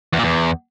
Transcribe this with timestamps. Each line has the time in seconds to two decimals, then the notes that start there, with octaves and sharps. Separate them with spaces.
0.13 E2
0.18 A#2
0.24 E2